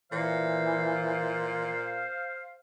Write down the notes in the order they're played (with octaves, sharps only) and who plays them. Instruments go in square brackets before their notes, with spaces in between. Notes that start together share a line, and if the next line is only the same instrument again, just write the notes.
[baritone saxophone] A#2 [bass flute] E3 [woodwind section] C5 F5